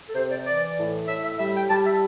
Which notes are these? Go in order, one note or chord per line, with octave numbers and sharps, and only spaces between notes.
A4
C3 C5
D5
E3 D5
A2
A2 E5
E5
G3 E5
G5
G3 A5
E5